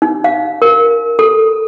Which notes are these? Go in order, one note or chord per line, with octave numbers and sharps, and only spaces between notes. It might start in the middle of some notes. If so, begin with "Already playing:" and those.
D#4
F5
A#4
A4